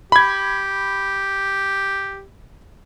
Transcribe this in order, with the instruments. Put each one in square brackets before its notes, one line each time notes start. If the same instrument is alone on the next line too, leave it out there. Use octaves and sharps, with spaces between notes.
[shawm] G4 [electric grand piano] B5 G#6